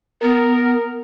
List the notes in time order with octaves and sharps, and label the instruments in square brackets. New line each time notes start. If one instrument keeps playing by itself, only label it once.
[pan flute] B3 [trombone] A#4